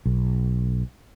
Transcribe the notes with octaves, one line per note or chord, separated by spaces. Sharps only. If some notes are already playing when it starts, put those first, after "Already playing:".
B1